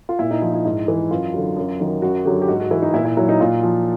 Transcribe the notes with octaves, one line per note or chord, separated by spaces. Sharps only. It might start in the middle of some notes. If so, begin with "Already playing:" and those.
F4
A#2 E4
D#4
F3 E4
E4
G#2 E4
E3
F#2 F4
D3 F#3
F#2
D#3 F#3
F#2 F#4
D3 F#3 G4
G4
G#2 F#4
F#4
E3 E4
D#4
A#2 E4
E4
F#3 E4
D#4
A#2 F4
F3